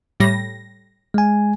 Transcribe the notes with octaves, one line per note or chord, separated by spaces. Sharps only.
A2 G3 A#6
G#3 G#5